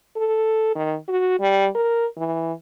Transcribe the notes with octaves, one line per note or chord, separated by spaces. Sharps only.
A4
D#3
F#4
G3
A#4
E3